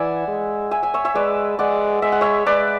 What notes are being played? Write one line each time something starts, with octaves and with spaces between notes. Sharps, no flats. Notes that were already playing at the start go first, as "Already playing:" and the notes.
Already playing: E3 D5 E5 F#5 G#5
G#3
E5 G#5
E5 G#5
C#5 E5
C#5 E5
G#3 B4 D5
G#3 D5 F#5
G#3 E5
F#5
C#5 E5
G#3 B4 D5